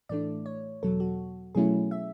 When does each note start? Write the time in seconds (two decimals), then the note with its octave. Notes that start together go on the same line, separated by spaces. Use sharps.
0.09 A2 E3 A3 D4 D5
0.46 C#5
0.83 E2 B2 F#3 A4
1.00 F#4
1.55 B2 F#3 A3 C#4 E4 G#4
1.91 E5